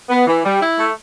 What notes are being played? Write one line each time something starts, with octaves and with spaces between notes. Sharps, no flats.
B3
E3
G3
E4
A3